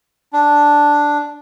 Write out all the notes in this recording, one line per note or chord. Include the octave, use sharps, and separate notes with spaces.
D4